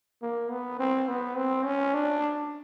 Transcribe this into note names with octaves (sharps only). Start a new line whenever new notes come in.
A#3
B3
C4
B3
C4
C#4
D4